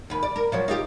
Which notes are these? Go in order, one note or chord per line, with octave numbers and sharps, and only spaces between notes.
D#2 B4
D5
A#4
F3 F#3 C#5
D#4 F4 G4